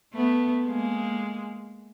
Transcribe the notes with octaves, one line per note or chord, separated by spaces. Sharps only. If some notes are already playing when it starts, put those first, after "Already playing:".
A3 B3
G#3 A#3